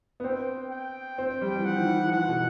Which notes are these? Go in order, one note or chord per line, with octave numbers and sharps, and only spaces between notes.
B3
C4 G5
G5
C4
G3
E3
F3 F#5
D#3
E3
F3
E3 F#5
B2